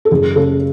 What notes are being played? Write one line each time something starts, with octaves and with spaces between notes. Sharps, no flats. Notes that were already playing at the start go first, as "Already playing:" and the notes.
A4
F#1 G#4
C#3 A4